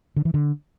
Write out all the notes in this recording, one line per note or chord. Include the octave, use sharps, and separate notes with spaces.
D3
E3
D3